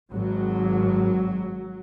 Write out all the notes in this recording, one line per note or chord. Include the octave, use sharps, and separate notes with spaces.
G#1 G#2 F#3